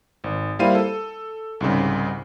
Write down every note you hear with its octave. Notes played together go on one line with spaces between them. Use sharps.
G#1
G3 A#3 E4 C5 F5 D#7
A4
C2 G#2 C#3